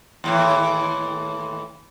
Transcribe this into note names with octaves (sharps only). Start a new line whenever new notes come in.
D#2 A2 E3